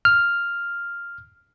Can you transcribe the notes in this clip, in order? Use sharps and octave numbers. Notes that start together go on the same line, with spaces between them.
F6